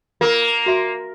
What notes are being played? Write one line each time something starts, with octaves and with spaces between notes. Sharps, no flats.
A#3 F4 A#4
F#4 E5 C6